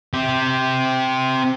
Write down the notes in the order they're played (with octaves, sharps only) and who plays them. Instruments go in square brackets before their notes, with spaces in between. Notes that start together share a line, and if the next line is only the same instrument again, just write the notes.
[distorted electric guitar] C4 G4